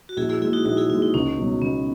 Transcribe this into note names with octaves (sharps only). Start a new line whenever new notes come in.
F#4
A#1 E4 G#4
E4 G#4
A#2 G#3 E4 G#4
D#4 F#4
A#1 D#4 F#4
E4 G#4
A#2 G#3 E4
D#4
C#2 C#4
B2 F#3
C#2 B3